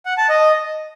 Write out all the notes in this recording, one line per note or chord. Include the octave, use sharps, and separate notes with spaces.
F#5
A5
D#5